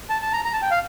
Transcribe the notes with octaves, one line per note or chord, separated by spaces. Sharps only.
A5
A5
A#5
A#5
A5
G5
F5